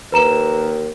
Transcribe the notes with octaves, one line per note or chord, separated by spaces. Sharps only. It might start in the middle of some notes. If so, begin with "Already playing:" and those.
D#2 B4 A#5 E7